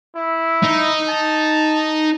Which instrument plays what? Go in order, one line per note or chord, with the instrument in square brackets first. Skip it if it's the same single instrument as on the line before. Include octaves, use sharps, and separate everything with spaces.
[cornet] E4
[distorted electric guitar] D#4
[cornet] A5